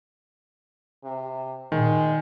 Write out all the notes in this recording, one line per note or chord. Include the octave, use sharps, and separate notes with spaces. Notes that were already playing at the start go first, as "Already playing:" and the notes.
C3
A#2 D#3 G#3